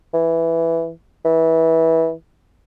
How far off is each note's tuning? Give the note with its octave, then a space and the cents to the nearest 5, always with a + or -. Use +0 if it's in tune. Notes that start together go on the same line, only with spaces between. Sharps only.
E3 +5
E3 -20